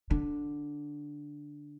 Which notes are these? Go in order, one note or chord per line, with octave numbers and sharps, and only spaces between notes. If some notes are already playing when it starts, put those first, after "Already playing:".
D3